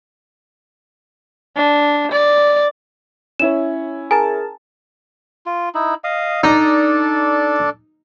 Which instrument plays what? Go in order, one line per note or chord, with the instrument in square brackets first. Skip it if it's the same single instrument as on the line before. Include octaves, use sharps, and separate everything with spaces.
[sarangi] D4
D5
[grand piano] C#4 E4 C#5 [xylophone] E7
[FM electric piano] G#4 A#4 A5 [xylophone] G#5
[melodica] F4
D#4 E4
D#5 F5 D#6
[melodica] D4 A4 D5 [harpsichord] D#4